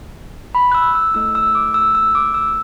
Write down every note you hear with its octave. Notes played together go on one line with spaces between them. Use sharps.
B5
F#6
E6
E6
A3 E4 A4 E6
E6
D6
E6
E6
D6
E6